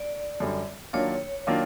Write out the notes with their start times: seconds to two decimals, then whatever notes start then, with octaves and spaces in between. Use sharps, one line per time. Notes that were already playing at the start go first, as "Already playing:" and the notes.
Already playing: D5
0.40 F#2 D3 G3
0.93 D#3 F#3 A#3 D4 F4 C#5
1.47 D#3 F#3 A#3 D4 F4